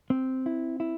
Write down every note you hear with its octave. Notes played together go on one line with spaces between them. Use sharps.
C4
E4
E4